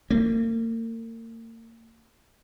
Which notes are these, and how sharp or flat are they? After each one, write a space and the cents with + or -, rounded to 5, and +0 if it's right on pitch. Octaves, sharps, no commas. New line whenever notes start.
A#3 -40